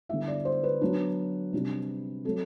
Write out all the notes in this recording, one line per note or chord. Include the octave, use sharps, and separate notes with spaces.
D3 G3 B3 E4 E5
D5
C5
B4
F#3 B3 D4
C3 G3 D4
F#3 A3 C4 A4